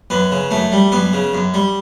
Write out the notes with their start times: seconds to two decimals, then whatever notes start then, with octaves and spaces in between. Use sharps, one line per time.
0.10 F#2 B3
0.31 C#3
0.51 F#2 A3
0.72 G3
0.92 F#2 B3
1.13 C#3
1.33 F#2
1.54 G3